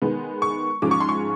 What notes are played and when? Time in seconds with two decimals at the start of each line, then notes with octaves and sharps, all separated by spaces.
0.02 D#3 G#3 B3
0.42 C#6
0.82 G#2 F3 G#3 C#4 D6
0.91 C#6
1.00 C6
1.09 C#6